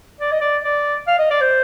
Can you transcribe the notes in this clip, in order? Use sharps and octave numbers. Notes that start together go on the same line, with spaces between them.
D5
D#5
D5
D5
F5
D#5
D5
C5